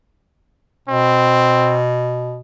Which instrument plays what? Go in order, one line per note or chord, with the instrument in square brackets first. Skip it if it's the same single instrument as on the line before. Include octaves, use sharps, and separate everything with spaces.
[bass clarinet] B2 [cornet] C4